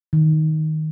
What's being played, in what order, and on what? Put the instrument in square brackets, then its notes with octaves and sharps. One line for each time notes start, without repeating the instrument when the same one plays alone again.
[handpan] D#3